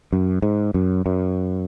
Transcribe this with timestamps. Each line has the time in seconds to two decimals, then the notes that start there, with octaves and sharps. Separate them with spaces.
0.13 F#2
0.42 G#2
0.74 F#2
1.06 F#2